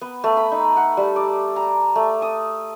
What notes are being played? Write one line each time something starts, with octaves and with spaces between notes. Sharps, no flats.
B3
A3
B5
D#4
F#5
G3
D5
A#5
A3
D#6